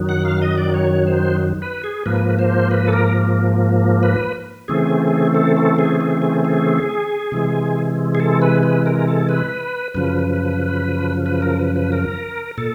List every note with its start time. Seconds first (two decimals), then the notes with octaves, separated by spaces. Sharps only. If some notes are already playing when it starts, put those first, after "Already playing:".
Already playing: F#2 D#3 F#3
0.09 F#5
0.25 F5
0.42 D#5
0.58 D5
0.74 C#5
1.07 C5
1.62 B4
1.84 G#4
2.06 G#2 F3 A#3 B4
2.39 C5
2.71 B4
2.87 A4
2.93 A#4
4.03 B4
4.68 C#3 E3 A3 C4 G#4
5.35 A4
5.57 A4
5.79 G#4
6.01 G#4
6.22 G#4
6.45 G#4
7.32 C3 E3 G#3
8.15 G#4
8.20 A4
8.42 B4
8.63 B4
8.86 A#4
9.07 A4
9.29 B4
9.95 F#2 C#3 F3 B4
11.26 B4
11.42 A#4
11.59 B4
11.76 B4
11.92 A#4
12.58 A#2 A4